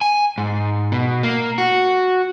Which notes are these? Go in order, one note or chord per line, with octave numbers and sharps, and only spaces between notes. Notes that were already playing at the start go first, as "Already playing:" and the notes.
G#5
G#2
B2
A#3
F#4